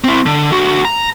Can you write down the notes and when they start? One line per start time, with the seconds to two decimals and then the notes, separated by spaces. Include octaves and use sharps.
0.04 C4 E4
0.26 D3
0.51 D3 F#4
0.85 A#5